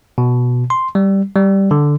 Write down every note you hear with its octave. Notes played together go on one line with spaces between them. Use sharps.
B2
C6
G3
G3
D3